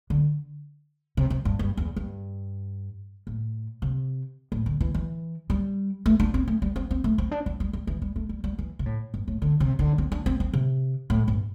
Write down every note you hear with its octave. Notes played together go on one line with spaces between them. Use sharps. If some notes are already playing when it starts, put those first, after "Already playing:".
D3
C3
C3
G2
G2
E2
G2
A2
C3
A2
D3
E3
E3
G3
A3
D4
C4
A3
G3
C4
C4
A3
C4
D4
C4
G3
G3
E3
G3
A3
G3
G3
E3
C3
A2
G2
A2
D3
C3
D3
C4
D4
C4
C4
C3
A2
G2